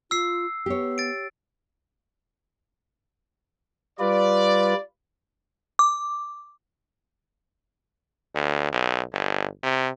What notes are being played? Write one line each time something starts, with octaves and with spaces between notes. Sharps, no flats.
F4 E6 C7
B3 G4 C#5
A6 D7
G3 F4 B4 D5
D6
D2
B1
G1
C3